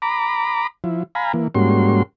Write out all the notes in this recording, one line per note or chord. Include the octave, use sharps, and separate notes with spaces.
A#5 B5 D6
F3 E4
F5 G#5 A#5 B5
E3 A#3
G#2 G3 A#3 C#4 F#4 C6